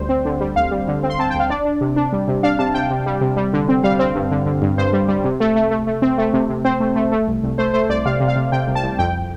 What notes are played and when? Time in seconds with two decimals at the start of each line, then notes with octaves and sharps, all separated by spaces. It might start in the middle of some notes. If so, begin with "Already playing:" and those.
Already playing: D2 G3 C5
0.09 C4
0.25 D3
0.41 G3
0.56 D2 F5
0.71 G3
0.88 D3
1.03 C4
1.10 C6
1.19 C4 A5
1.30 D2 G5
1.40 F5
1.50 D4 D5
1.65 D4
1.81 C3
1.96 D4
2.12 G3
2.28 C3
2.43 D4 F5
2.59 C3 A5
2.74 C3 G5
2.90 C3
3.06 G3
3.21 C3
3.37 G3
3.53 D3
3.69 C4
3.84 G3 F5
3.99 C4
4.15 G2
4.31 D3
4.46 D3
4.62 G2
4.78 G2 C5
4.93 G3
5.08 G3
5.24 C3
5.40 A3
5.56 A3
5.71 A3
5.87 A3
6.02 C4
6.18 A3
6.33 C3
6.49 C3
6.65 C4 C5
6.80 A3
6.96 A3
7.12 A3
7.27 C2
7.43 C2
7.58 A3 C5
7.74 A3 C5
7.90 C2 D5
8.05 C3 F5
8.20 C3
8.28 F5
8.36 C3
8.52 C3 G5
8.68 C2
8.75 A5
8.83 C2
8.99 F2 G5